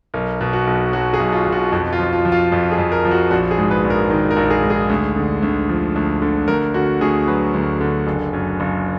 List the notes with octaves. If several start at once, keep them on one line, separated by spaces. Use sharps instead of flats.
B1 A#4
B2
F#4
B1
F#3 F#4
G#4
B1
F4
B2
F#4
F2 F#4
F4
F3
F4
F3
F4
F2
G#4
F2
A#4
F3
F#4
A#1 F#4
G#4
G#2
B4
A#1
A#4
D#3
A#4
A#1
G#4
G#2
G#4
D2
D3
D2
F3
D2
D3
D2 A#4
D3 F#4
D2 G#4
F#3 B4
D2
D3
F#1
F#2
F#1